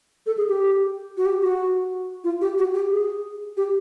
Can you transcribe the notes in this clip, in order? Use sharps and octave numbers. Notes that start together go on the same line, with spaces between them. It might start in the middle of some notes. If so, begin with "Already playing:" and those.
A4
G#4
G4
F#4
G4
F#4
F4
G4
F#4
G4
G#4
G4